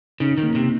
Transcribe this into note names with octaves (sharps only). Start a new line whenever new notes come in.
C#3 D#4
D#3
A#3
C3